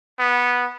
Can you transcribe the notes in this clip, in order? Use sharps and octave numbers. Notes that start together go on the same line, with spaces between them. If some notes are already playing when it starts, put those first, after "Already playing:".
B3